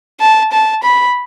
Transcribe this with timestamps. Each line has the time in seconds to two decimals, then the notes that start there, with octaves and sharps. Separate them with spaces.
0.21 A5
0.52 A5
0.83 B5